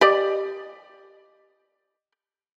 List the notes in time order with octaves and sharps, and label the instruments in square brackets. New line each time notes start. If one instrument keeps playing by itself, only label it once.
[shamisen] G4 D5 D#5